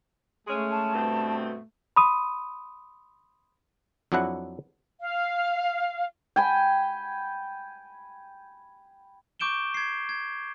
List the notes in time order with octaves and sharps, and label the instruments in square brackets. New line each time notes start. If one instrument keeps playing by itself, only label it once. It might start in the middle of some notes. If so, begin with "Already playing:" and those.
[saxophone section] G#3 C#4 G#4 [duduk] A3
[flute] A5
[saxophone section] G2 B2 C4
[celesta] B5 C6 D#6 D#7
[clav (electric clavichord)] F2 F#3 D4 E4 F#5
[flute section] F5
[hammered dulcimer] G5 G#5 B5
[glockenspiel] C#6 D6 G6 D7 E7 G7
G#6 C7
G#6